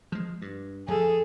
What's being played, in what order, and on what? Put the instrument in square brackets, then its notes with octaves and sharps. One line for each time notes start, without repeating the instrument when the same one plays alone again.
[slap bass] F3 G#3
G2
[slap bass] F2 F3 [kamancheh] G#4 A4